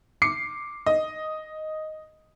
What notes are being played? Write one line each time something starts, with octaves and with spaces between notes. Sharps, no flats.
D6 C7 C#7
D#5